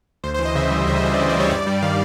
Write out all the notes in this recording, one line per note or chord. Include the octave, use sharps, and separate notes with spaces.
D2 C5
C5
E3
D#5
C#3 E5
G3
D2 E5
D#5
E3 E5
D5
C#3 D#5
D5
G3
C#5
G2 D5
G3
D#3 F5